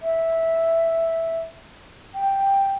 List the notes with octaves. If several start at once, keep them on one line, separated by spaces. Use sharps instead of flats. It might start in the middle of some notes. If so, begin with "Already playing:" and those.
E5
G5